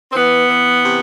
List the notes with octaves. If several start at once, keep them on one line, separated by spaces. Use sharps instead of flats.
C4
E3 B3
E3
C3